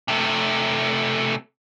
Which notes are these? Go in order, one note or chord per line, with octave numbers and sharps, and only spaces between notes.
C3 A3